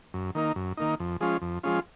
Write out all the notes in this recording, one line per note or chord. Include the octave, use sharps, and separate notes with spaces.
F#2
D#3 A#3 D#4
F#2
D#3 A#3 D#4
F2
F3 G#3 C#4 F4
F2
F3 G#3 C#4 F4